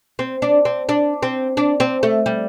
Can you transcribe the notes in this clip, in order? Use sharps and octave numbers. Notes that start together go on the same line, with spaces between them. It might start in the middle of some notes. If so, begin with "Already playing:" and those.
C4
D4
C4
D4
C4
D4
C4
A3
G3